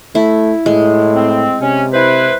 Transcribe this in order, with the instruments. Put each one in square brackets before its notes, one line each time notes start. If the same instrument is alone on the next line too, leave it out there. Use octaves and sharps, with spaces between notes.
[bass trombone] A3 [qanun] E4
[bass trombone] A2 [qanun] G#3
[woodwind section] C4
[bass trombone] C3 [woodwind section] C#4
[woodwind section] E4 B4 C5